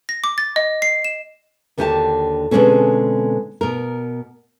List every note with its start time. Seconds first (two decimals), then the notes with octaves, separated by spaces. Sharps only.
0.09 A#6
0.24 D6
0.38 A6
0.56 D#5
0.82 C7
1.05 E7
1.78 D#2 D3 F#4 G4 G5 A5
2.51 B2 D3 G#3 C4 C#4 A4
3.61 B2 A#4